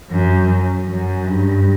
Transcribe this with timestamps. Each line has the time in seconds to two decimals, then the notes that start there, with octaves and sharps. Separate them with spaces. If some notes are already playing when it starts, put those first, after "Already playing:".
0.10 F#2
0.87 F#2
1.26 G2